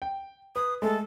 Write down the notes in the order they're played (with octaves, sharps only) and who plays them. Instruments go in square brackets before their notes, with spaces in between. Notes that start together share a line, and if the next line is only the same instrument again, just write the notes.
[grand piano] G5
[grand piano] B4 [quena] D#6
[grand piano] G#3 A3 [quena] A4